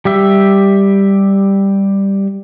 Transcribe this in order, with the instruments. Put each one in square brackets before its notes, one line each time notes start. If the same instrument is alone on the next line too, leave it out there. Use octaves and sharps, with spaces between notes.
[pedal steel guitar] G3 G4 E5